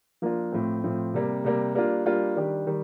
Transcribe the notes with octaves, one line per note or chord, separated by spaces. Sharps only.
F3 A#3 D4 F4
A2 F3 C4
A2 F3 C4
C3 G3 A#3
C3 G3 A#3
G3 A#3 D4 F4
G3 A#3 D4 F4
D#3 G3 D4 G4
D#3 G3